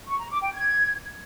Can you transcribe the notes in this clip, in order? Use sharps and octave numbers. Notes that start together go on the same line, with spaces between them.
C#6
A#5
D6
G5
G#6